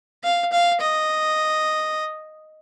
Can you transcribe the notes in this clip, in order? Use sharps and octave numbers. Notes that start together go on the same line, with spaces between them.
F5
F5
D#5